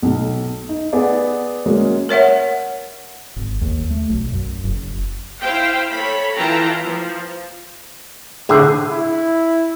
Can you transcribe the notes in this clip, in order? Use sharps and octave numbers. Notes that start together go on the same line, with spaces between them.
B1
D#4
B3 G#4 D5
F#3 G#3 A#3 C#4
A#4 C#5 E5 F#5
G#1
D#2
A3
B1
F#2
F#1
E4 C5 F5 G5
A4 C#5 B5
E3 E4 F4 G5 A5 A#5
F3
A2 D3 G#4 C5
E4